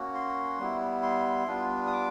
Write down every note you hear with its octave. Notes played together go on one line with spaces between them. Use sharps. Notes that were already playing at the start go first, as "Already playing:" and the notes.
Already playing: A#3 C#4 F#4
C6
G3 B3 E4
C6
G3 B3 D4 F4
D#6
D6